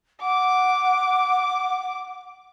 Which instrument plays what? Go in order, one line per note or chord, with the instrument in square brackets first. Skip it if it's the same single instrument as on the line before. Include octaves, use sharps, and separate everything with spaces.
[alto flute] F#5 [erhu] D6